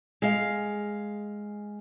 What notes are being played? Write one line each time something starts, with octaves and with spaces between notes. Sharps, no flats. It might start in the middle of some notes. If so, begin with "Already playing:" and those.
G#3 F5